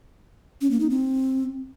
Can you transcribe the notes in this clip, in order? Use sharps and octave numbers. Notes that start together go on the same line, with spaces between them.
C#4
A#3
D#4
C4